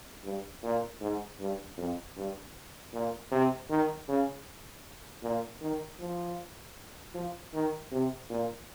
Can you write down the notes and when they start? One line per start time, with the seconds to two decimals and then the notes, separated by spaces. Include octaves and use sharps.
0.24 G2
0.63 A#2
1.01 G#2
1.40 G2
1.78 F2
2.17 G2
2.93 A#2
3.31 C3
3.70 D#3
4.08 C#3
5.23 A#2
5.62 D#3
6.00 F3
7.14 F3
7.54 D#3
7.92 C3
8.30 A#2